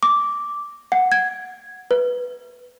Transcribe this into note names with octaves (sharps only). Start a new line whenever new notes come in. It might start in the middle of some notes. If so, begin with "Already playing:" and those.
D6
F#5
G#6
B4